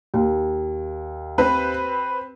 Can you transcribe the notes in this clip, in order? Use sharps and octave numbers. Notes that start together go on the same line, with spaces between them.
D#2
C4 B4